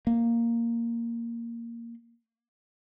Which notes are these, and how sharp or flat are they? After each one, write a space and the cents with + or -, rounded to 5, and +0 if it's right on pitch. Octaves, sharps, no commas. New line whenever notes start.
A#3 -5